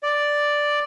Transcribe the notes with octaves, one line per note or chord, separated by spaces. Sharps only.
D5